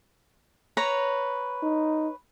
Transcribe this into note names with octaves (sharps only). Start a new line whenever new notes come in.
B4 C#5 A#5
D#4